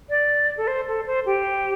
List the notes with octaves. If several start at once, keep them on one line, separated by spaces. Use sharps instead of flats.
D5
A4
C5
A4
C5
G4